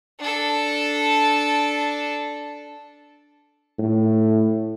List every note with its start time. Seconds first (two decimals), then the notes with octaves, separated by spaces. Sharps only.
0.19 D4 A4
3.79 A2